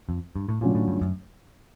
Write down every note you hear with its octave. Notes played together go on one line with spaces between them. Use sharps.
F2
G2
A2
A#2 D3 F#3 A3 C#4 F4
A2
G2
F#2